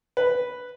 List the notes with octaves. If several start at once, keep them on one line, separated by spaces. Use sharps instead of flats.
B4